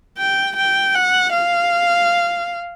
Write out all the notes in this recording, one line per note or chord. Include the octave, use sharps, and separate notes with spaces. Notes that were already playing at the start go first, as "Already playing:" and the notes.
G5
G5
F#5
F5